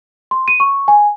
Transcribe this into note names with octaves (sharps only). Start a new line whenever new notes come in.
C6
D#7
C#6
G#5